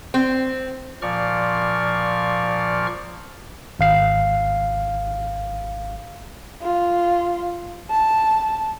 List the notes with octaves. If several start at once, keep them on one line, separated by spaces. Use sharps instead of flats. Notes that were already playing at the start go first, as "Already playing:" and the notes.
C4
A#2 F3 D5 C#6 F6
G#1 F5 C7
F4
A5